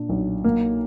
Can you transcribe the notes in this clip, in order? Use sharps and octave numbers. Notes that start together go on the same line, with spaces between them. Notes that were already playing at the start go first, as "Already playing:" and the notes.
Already playing: A#2 D4
B1
A#3